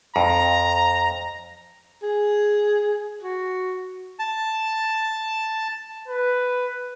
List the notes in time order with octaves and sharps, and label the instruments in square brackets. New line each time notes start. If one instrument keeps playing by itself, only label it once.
[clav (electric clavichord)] F2 [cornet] A#5
[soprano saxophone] G#4
F#4
[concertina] A5
[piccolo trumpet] B4